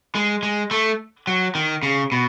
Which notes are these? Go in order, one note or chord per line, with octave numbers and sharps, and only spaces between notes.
G#3
G#3
A3
F#3
D#3
C#3
B2